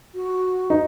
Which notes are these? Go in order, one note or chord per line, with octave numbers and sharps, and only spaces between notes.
F#4
D#4